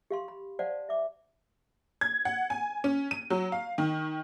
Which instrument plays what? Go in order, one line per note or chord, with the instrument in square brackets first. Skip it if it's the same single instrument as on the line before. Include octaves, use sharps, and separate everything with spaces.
[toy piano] G4 F5 C6
B5
C5 D5 F5 F#5 A5
E5 D6
[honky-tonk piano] G#6
F#5
G#5
C#4
D#7
F#3
F5
D#3